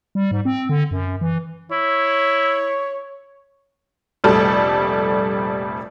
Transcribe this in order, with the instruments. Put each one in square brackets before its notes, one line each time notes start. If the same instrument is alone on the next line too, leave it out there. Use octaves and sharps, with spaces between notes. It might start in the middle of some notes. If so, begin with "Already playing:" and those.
[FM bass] G3
G#2
C4
D3
F#2
E3
[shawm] E4 [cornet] C#5
[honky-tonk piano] F1 A#1 G3 A3 A4 A5